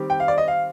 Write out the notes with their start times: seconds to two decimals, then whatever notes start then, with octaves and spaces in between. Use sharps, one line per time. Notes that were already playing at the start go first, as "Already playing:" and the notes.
Already playing: D#3 G3 C4 G4
0.10 G5
0.20 F5
0.28 D5
0.38 D#5
0.48 F5